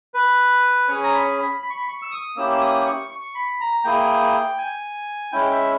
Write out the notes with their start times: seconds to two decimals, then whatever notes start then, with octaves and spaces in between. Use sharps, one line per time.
0.14 B4
0.88 C#4 G#4 C#5
1.04 A#5
1.14 B5
1.39 B5
1.63 B5
1.70 C#6
1.77 B5
1.88 C#6
2.02 E6
2.11 D#6
2.36 A#3 C#4 E4 G4 E6
2.52 E6
2.61 D#6
2.86 C#6
3.11 C#6
3.35 B5
3.60 A#5
3.84 A#3 E4 G#4 G5
4.58 G#5
5.32 G#3 C#4 E4 G5
5.51 E5